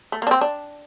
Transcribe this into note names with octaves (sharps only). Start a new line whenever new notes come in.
A3
A#3 D4
C4
D4